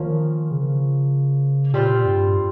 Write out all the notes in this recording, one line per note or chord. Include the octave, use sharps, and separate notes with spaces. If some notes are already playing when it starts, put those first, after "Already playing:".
Already playing: D#3 F3 A#3 C#4
C#3
A#2 G3 C4 F4
G2